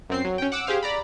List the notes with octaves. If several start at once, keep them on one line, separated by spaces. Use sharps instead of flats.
F#2 C4 C7
F#3
C#4 G5
F#5 D6 E6
G4 G#4 C5 F5
D5 A#5 B5